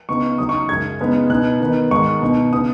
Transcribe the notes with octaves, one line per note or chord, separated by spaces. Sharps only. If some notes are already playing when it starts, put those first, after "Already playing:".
C#3 B3 D#4 C#6
C#3 F#3 D#4 D#6
C#6
F#2 C#3 G#3 G#6
C#3 G#3 B3 D#4
B2 B3 D#4 F#6
D#3 B3 D#4
G#2 D#3 G#3 C#6
B2 B3 D#4
C#3 B3 D#4 D#6